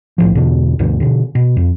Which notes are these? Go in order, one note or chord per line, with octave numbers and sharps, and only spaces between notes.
B1 A2 F3
E2 B2 D3
D2 G2 B2 D3
B2 D3
B2
F2